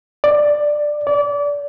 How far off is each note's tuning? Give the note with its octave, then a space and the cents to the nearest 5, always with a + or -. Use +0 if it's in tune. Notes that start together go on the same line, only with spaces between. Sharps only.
D5 +10
D5 -30